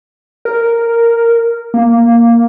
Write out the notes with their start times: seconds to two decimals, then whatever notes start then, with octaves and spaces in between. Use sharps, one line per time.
0.45 A#4
1.74 A#3